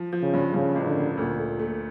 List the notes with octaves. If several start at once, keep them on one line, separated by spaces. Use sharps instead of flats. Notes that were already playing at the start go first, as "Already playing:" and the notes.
Already playing: F3
F3
C#3
G2
G2 C#3
A1
D3
A#3
D2 A#2
A3
A3